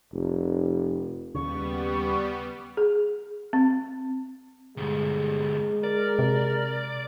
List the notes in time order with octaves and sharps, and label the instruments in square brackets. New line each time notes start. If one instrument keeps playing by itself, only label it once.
[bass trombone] F1
[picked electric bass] D#2 C#3 [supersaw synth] G3 B3 [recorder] C#6
[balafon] G#4
C4
[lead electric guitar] D2 G2 [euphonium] G#3
[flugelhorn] A#4 [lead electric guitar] D5
[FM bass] C3